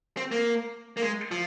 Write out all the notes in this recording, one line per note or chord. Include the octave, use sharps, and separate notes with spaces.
C4
A#3
A#3
G#3
F3